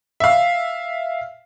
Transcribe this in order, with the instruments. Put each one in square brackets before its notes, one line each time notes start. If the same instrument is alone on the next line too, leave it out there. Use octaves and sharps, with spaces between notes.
[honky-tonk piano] E5 F5